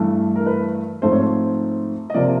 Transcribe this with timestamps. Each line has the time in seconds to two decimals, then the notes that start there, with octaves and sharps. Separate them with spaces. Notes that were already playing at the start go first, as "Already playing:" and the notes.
Already playing: G2 E3 A3
0.36 A#4
0.46 B4
1.02 G#2 F3 A3 C4 C5
1.12 C#5
1.21 C5
2.10 D#5
2.14 C3 F3 A#3 D5